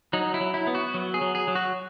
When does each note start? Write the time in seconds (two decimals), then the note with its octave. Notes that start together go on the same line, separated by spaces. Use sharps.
0.13 F#3 D#4
0.34 E4
0.41 F#3
0.54 E4
0.67 B3
0.75 F#4
0.94 F#3
1.14 G#4
1.21 F#3
1.35 G#4
1.48 F#3
1.55 F#4